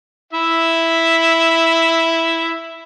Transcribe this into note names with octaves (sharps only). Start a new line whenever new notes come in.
E4 E5